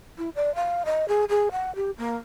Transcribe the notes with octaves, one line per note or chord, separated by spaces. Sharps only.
E4
D5
F5
D#5
G#4
G#4
F#5
G4
A#3